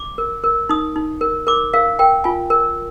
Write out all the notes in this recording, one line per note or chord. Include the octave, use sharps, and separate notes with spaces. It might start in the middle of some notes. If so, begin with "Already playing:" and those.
Already playing: D6
A#4
A#4
D#4 D#6
D#4
A#4
A#4 D6
A#4 F5
A#4 G5
F4 G#5
A#4